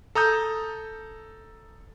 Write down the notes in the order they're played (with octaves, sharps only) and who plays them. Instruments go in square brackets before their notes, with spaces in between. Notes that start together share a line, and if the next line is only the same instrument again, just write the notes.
[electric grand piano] A4 A#5 D#6 G6